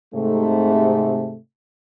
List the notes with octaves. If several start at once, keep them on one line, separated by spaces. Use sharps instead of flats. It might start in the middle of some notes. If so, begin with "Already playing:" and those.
G#2 C3 A3